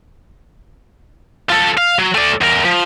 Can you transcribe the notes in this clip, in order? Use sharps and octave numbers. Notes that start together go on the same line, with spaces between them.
F4 A4
F5
F#3
A3 D5
E2 A#4
F3